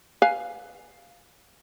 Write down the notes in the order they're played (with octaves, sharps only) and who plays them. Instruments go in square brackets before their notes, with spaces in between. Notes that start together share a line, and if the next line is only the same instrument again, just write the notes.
[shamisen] B4 F5 G#5